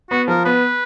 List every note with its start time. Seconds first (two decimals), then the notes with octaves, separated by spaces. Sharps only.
0.11 B3 F#4
0.28 F3 A#4
0.45 B3 B4